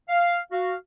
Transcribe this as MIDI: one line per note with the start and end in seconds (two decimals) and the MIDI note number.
0.09 0.38 77
0.52 0.73 66
0.52 0.73 77